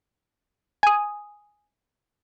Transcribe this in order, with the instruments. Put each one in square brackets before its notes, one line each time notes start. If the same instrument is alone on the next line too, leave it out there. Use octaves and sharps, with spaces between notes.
[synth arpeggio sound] G#5 D#6